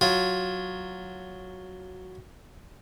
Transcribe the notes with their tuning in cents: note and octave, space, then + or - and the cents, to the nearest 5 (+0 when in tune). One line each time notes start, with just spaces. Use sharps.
F#3 +0 F4 +10